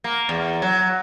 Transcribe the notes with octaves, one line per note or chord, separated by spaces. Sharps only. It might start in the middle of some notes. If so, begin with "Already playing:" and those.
A#3
E2
F#3